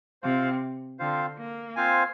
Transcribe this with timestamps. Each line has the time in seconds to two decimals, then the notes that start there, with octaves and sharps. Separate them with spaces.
0.22 C3 C4 F4 C5 F5
0.99 D3 C4 F4 C5 F5
1.38 A#3
1.76 C4 F4 C5 F5 G#5